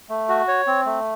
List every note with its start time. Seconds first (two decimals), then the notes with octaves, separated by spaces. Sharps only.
0.09 A3
0.29 F#4
0.48 C#5
0.67 C4
0.86 A3